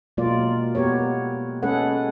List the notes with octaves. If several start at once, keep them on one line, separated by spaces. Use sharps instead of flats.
B2 F#3 G#3 A#3 F4 D5
B3 G4 A#4 C#5
G#3 C#4 G#4 A4 B4 F#5